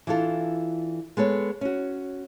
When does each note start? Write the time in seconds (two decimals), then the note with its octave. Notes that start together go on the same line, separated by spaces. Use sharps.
0.07 E3 D4 F4 A4
1.17 G#3 B3 A4 C#5
1.61 C#4 F#4